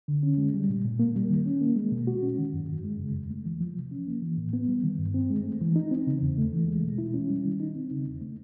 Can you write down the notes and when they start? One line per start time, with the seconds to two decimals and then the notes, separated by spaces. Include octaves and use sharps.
0.08 D3
0.23 C#4
0.38 G#3
0.54 G3
0.69 A#2
0.84 A#2
0.99 A#3
1.16 G3
1.30 D#3
1.46 C#4
1.61 A#3
1.76 G#3
1.92 B2
2.07 F#4
2.23 C#4
2.38 D#3
2.53 F#2
2.69 F#2
2.84 G#3
2.99 C#3
3.15 E2
3.30 A3
3.45 E3
3.61 F3
3.76 C3
3.91 C#4
4.07 A#3
4.22 E3
4.37 A2
4.53 B3
4.68 G3
4.84 D#3
4.98 G2
5.14 C4
5.30 G#3
5.45 A3
5.61 E3
5.76 D#4
5.91 C4
6.07 C#3
6.22 E2
6.38 A3
6.53 E3
6.68 G#3
6.83 B2
6.98 E4
7.14 C#4
7.29 G3
7.45 D#3
7.60 D#4
7.75 C4
7.91 C#3
8.06 E2
8.21 A3